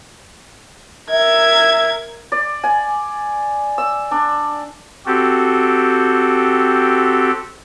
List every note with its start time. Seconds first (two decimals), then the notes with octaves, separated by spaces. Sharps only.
1.10 A#4 E5 G#6
2.32 D5
2.64 G#5
3.78 E6
4.11 D4
5.06 C4 F#4 G4 A4